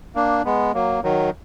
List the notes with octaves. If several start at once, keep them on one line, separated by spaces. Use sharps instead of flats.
A#3 D4
G#3 B3
F#3 A#3
D#3 F#3